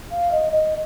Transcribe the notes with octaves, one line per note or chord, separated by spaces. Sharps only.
F5
D#5
D#5